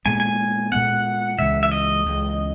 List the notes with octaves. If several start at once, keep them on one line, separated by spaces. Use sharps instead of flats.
A#2 G#3 B3 G#5
G#5
A#2 G#3 B3 F#5
C#2 C#3 E3 G#3 E5
E5
D#5
C#2 C#3 E3 G#3